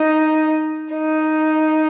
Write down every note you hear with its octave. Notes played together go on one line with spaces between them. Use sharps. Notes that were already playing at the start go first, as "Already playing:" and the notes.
Already playing: D#4
D#4